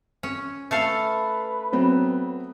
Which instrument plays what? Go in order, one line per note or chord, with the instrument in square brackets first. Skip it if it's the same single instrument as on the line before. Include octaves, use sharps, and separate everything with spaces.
[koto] C#4
[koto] A3 A4 F5 [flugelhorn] B4
[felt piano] F#3 B3 C4